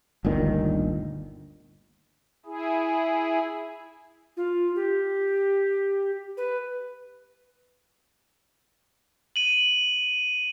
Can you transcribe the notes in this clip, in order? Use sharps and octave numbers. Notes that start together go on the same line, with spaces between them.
G1 D2 A#2 D#3
E4 G#4
F4
G4
B4
D#7 F#7